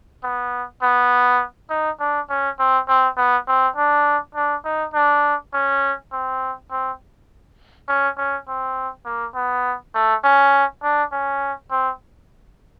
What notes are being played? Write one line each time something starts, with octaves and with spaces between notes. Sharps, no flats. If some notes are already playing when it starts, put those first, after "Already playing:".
B3
B3
D#4
D4
C#4
C4
C4
B3
C4
D4
D4
D#4
D4
C#4
C4
C4
C#4
C#4
C4
A#3
B3
A3
C#4
D4
C#4
C4